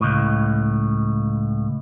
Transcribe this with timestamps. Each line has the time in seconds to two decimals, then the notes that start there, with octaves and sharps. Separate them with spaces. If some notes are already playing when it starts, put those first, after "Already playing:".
0.01 C#2 A2